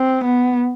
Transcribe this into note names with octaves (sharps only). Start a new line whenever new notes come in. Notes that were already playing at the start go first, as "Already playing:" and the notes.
Already playing: C4
B3